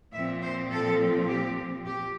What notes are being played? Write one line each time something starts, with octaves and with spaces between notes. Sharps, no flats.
A#2 F3 C4 E5
C5
A4
G4
G4